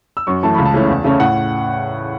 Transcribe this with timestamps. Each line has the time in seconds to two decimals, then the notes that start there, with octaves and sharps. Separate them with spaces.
0.17 E6
0.27 F#2 C#6
0.43 E3 A3 A5
0.55 C#2 B5
0.65 A5
0.74 C#3 E3 A3 C#4
0.89 E2
1.04 C#3 A3 C#4
1.19 A2 F#5